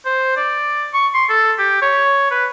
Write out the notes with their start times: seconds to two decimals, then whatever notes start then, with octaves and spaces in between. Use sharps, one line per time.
0.05 C5
0.37 D5
0.94 C#6
1.14 C6
1.29 A4
1.59 G4
1.82 C#5
2.31 B4